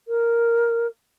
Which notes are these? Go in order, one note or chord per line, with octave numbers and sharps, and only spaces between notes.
A#4